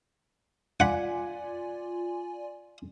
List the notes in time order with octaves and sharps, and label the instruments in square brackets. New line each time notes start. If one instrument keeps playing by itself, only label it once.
[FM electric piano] F4 D5 G#5 [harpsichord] F#5 B5